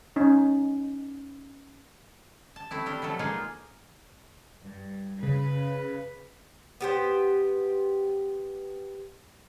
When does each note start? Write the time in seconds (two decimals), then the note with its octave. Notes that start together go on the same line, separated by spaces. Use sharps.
0.16 C#4 D#4
2.56 A5
2.71 A3 C4 E4
2.86 G3 D4
3.02 B2 F3 F#3 A4
3.19 G#3 A#3 D#4 F4 G#4
4.64 G2
5.23 C#3 B4
6.81 B3 G4 C5